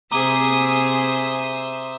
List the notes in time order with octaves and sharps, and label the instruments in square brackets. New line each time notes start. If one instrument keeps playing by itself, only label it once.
[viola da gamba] C3 G#4 [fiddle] C5 E5 [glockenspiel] A#5 D6 G7 [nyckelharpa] D#6